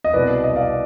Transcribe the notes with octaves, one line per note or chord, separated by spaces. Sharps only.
D#5
C2 B2 B4 D5
D#5
D5 F5